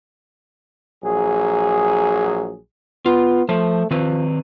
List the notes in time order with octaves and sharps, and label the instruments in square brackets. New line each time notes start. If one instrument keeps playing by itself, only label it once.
[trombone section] A#1 F#3 G#4
[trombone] B3 [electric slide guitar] F4
[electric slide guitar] F3 C5 [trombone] A3
[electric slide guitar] D#3 C4 B4 [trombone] F3